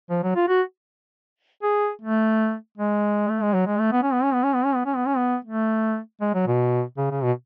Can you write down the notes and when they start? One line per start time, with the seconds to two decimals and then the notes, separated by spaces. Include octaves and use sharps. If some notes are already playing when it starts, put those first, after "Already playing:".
0.10 F3
0.23 F#3
0.35 F4
0.48 F#4
1.63 G#4
2.01 A3
2.77 G#3
3.29 A3
3.42 G#3
3.54 F#3
3.66 G#3
3.79 A3
3.92 B3
4.02 C#4
4.13 B3
4.23 C#4
4.34 B3
4.43 C#4
4.55 B3
4.65 C#4
4.75 B3
4.85 C#4
4.96 B3
5.06 C#4
5.17 B3
5.45 A3
6.21 G#3
6.34 F#3
6.47 B2
6.97 C#3
7.10 C#3
7.23 B2